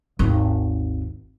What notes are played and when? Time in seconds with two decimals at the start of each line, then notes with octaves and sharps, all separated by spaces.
0.19 G#1 D#2